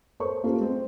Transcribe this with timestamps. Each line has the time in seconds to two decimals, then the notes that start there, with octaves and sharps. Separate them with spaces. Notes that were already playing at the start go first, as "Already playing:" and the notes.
0.20 A4 A#4 C5 C#5 C#6
0.43 A#3 C#4 F4 G4 A4 C5
0.61 G#3 C4